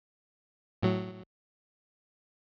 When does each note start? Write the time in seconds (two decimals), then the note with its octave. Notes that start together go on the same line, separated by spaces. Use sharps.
0.82 A2 F#3